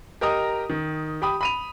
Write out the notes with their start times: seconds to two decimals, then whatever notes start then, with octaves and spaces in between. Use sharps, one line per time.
0.21 G4 A#4 D#5 A#5 D#6
0.70 D#3
1.22 G4 G5 B5 D#6
1.41 B5 D#7 F7